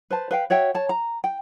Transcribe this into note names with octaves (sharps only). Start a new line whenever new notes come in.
B4 C5 A5
B4 F5 G5
F#4 C#5 E5 G5
C#5 A5
A#5
G5